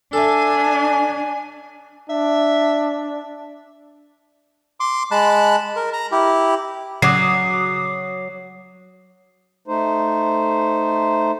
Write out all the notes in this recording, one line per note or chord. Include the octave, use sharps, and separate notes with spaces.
D4 A4 E5 G#5
D4 E5
C6 D6
G#3 A5 B5 F#6
A#4
A#5
E4 G4
C#3 F#3 D6 D#6 C7
A3 D#4 C5